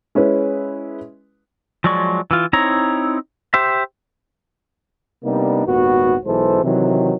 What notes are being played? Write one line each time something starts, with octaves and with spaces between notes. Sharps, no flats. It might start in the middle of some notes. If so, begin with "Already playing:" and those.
G#3 C#4 E4 B4
F3 F#3 G#3 D5 C#6
E3 F4
C4 D#4 E4 C#5 A#5
G4 C5 E5
C3 G3 A#3 B3 D4 D#4
G#1 D#2 A#2 B3 F#4
B1 E3 G#3 A4 C5
C3 D#3 E3 F#3